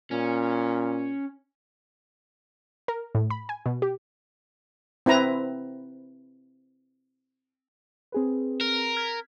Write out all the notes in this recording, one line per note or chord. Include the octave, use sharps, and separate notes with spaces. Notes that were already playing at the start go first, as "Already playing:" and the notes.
A#2 C#4
A#4
A2
B5
G#5
B2
G4
C4 E4 B4 A#5
C4 G#4 B4
A#4
F6 G#6 B6